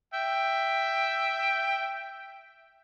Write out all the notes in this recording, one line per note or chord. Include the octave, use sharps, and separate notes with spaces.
E5 G5